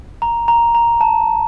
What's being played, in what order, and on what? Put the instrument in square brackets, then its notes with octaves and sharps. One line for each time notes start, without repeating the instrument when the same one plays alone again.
[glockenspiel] A#5
A#5
A#5
A5